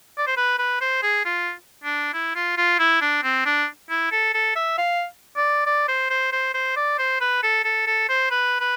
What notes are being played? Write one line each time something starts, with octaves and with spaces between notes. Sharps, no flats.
D5
C5
B4
B4
C5
G#4
F4
D4
E4
F4
F4
E4
D4
C4
D4
E4
A4
A4
E5
F5
D5
D5
C5
C5
C5
C5
D5
C5
B4
A4
A4
A4
C5
B4
B4